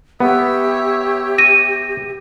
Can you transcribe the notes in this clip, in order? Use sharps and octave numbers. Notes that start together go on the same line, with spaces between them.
B3 G4 C#5 E5
A#6 D#7